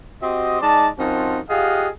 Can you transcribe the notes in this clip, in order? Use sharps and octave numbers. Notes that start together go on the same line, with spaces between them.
C4 F#4 G4 C5 D#5
G#3 D#4 D5 A5
F#2 C4 D#4 F4 F#4 A5
F4 G4 G#4 D#5 F5 F#5